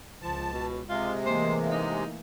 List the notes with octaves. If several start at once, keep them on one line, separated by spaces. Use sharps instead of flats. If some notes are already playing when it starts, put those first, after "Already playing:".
C#2 F3 A5
B2
C3 G#3 F4
E3 A3 A#3 C5
D#4